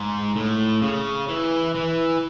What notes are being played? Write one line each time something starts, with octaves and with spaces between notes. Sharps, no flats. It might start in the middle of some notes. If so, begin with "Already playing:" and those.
Already playing: G#2
A2
C#3
E3
E3